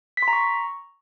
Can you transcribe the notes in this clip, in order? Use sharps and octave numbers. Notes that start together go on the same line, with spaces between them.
B6
C6
A#5
C#6